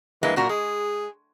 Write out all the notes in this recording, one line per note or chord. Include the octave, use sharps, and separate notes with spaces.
G2 E3 G#3 A#3
F#2 A#2 F#4 A#4
G#3 G#4